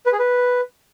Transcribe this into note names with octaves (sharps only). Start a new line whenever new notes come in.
B4
G#4
B4